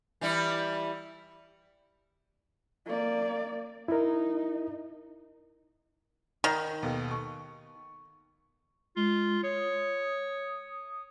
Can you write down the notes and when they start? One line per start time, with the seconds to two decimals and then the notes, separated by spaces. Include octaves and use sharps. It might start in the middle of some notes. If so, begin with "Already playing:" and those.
0.21 E3 G3 E4
2.86 A#3 D5
3.88 D#4 E4 A#4
6.44 D#3 D#5
6.83 D#2 B2 A4
7.11 C#6
8.96 G#3 F4
9.44 C#5 D#6